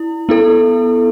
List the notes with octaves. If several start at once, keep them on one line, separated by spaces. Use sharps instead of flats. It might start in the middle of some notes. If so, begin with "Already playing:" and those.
Already playing: E4
B3 E4 A4